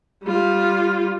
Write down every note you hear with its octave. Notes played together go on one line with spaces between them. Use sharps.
G3 F4